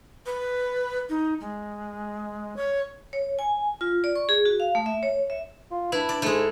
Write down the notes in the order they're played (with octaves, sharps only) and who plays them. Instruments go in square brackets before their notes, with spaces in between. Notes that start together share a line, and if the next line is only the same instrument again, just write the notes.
[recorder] B4
D#4
G#3
C#5
[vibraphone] C#5
G#5
F4
D5
C#6
G#4
F#4
F5
A3
E5
C#5
E5
[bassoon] F4
[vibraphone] D4 A5 [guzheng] E4 [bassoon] B4
[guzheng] D5
[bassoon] G#2 [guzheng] G#3 A3 [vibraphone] G#4 A4